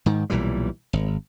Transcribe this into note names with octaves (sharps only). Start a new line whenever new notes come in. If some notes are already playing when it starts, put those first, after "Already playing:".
G#2 D#3
B1 A#2 E3 G3
G#1